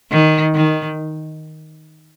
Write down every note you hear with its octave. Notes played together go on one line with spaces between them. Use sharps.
D#3
D#3